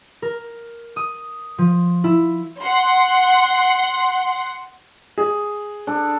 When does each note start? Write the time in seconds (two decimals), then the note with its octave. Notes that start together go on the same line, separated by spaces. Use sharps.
0.22 A#4
0.96 D#6
1.58 F3
2.04 E4
2.62 F#5 C6
5.18 G#4
5.87 D4 A4